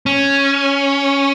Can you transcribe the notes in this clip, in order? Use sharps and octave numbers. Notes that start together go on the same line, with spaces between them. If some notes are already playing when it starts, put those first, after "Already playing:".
C#4